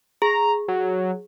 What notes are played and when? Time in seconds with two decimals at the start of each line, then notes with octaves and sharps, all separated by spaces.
0.22 G#4 A#5
0.68 F#3